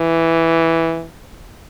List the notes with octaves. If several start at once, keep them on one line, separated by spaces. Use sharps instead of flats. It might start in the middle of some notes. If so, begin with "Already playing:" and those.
Already playing: E3